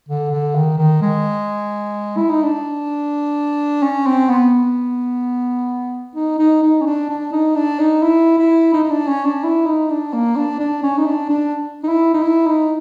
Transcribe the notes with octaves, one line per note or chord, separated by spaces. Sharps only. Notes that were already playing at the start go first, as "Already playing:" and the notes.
D3
D3
D#3
D#3
G#3
E4
D#4
D4
C#4
C4
B3
D#4
D#4
D#4
C#4
D4
D4
D#4
D4
D#4
E4
E4
D#4
D#4
D4
C#4
D4
E4
D#4
D4
A#3
D4
D4
C#4
D#4
D4
D4
D#4
E4
D#4
E4
D#4